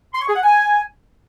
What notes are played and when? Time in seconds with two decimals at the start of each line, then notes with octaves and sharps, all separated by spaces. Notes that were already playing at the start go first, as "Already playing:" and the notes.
0.14 C6
0.21 C#6
0.28 G#4
0.36 F#5
0.43 G#5